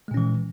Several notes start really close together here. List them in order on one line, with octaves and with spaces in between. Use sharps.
G#3 A#2 C#4 E3